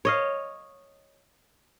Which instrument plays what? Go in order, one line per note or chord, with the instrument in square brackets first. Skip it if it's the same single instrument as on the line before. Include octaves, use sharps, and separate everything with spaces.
[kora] C#5 D#5 F5